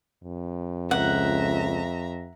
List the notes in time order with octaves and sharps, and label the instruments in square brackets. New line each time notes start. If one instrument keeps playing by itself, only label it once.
[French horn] F2
[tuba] C#2 [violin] E5 A#5 [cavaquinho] F#5